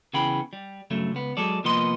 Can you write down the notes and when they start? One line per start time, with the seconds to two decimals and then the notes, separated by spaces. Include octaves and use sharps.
0.13 C#3 E3 B3 G#4 G5 B5
0.53 G3
0.90 G2 C#3 F#3 A3
1.12 C#2 B3
1.37 F#3 G#3 A4 D5
1.64 C2 F3 A#3 B3 D#5 C6